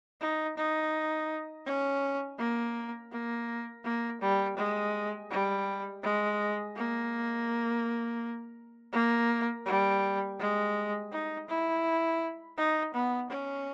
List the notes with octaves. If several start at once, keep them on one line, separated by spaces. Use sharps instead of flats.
D#4
D#4
C#4
A#3
A#3
A#3
G3
G#3
G3
G#3
A#3
A#3
G3
G#3
D#4
E4
D#4
B3
C#4